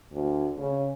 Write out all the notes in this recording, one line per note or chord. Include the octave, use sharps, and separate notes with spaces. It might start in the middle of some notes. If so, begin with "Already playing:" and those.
D2
C#3